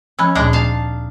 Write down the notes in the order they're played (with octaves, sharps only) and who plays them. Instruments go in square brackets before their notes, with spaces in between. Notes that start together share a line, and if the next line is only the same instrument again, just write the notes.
[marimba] F3 B5 E6 [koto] C#4
[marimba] D2 A#2 [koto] G#3 D4 D#4
[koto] F5 A5